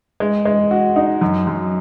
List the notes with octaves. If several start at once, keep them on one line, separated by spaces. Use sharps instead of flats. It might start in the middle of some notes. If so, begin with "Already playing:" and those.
G#3
G#3
F#4
D#4
F#2
F#2